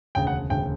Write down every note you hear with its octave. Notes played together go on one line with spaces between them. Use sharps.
E1 D2 C#3 G5
F#5
E1 D2 C#3 G5